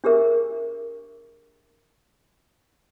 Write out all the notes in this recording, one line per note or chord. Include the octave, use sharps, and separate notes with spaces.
D4 G4 G#4 A#4 E5